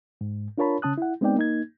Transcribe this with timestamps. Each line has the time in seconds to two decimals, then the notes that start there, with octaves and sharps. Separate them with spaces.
0.21 G#2
0.58 D4 F4 A#4 C#5 A5 B5
0.82 C#3 C#4 A5 D#6 F#6
0.98 E4 F#5
1.21 G#3 B3 C4 D#4 D5 G5
1.36 A#3 D#4 G#6